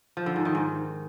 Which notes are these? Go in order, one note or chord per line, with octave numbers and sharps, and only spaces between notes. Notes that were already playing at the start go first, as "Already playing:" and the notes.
F3
D3
G#2
D#3
G#2